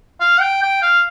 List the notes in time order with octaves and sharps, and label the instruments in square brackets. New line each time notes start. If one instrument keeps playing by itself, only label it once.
[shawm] F5
G5
G5
F5